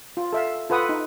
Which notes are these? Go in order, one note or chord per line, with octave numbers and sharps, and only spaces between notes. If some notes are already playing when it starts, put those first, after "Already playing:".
F4
A4 E5 F5
F4 A4 B4 F#5 D#6
D#4